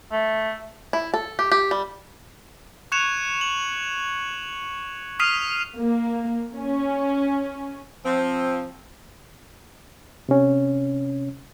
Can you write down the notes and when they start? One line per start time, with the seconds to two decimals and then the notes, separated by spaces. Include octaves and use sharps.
0.12 A3
0.93 E4
1.14 A4
1.39 G4
1.51 G4
1.71 G3
2.92 C#6 F#6 G#6 C#7 E7 F7
3.41 F#7
5.20 D#6 F6 B6 C7 D#7 F7
5.77 A#3
6.56 C#4
8.05 F3 C4
10.29 C3 C#4